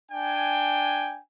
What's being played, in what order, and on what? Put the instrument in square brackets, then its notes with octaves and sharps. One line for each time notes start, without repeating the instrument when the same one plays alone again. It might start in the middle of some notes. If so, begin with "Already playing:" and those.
[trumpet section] D4 G5 G#5